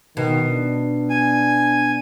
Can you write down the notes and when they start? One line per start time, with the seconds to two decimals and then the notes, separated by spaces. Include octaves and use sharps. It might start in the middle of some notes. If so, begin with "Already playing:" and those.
0.17 B2 D#3
0.48 D4
1.10 G#5